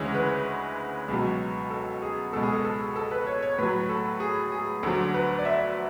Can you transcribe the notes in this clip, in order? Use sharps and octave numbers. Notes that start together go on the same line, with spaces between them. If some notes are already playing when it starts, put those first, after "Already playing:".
Already playing: D2 C#3 E3 G#3 C#5
B4
C#2 B2 F#3
A4
G#4
C#2 B2 G#3 A4
G#4
A4
A4
A4
B4
C#5
C#5
A2 F#3 B4
A4
G#4
G#4
D2 D3 F#3 A4
B4
D5
E5